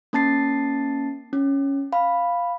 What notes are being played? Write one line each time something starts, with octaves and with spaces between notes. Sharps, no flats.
A#3 C#4 A5 A6 C7
C#4
F5 B5